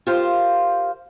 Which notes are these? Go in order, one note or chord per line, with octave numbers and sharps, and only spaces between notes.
F4 G4 A#4 C5 F5